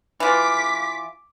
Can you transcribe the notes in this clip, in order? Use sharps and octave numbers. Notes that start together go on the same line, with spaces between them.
E3 F4 D6 B6